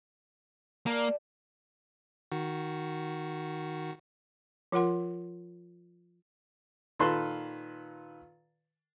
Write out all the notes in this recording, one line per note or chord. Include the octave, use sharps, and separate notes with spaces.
G3 A#3 D5 A5
D#3 F#4
F3 F4 A#4 F#5 C6
A#2 D#3 A4 B4 A5 C6